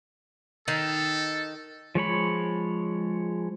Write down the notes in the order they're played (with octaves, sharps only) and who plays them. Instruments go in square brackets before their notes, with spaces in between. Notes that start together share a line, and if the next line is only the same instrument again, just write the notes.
[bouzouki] D#3 [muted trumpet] A4
[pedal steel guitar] F3 G#3 C#5 B5